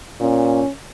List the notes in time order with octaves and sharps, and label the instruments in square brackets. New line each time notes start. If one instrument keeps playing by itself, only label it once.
[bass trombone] A#2 [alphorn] C#4